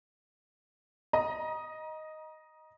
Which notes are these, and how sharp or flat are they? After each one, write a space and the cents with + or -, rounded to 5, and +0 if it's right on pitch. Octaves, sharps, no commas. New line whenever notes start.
D#5 +0 A#5 +30